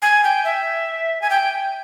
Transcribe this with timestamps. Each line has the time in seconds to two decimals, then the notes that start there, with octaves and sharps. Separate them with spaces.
0.02 G#5
0.24 G5
0.45 E5
1.22 G#5
1.30 G5